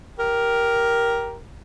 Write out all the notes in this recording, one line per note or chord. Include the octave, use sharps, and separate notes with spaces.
G4 A#4